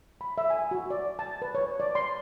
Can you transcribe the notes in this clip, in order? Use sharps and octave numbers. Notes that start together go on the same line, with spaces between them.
B5
E5
G#5
F#4
D5
A5
B4
C#5
D5
C6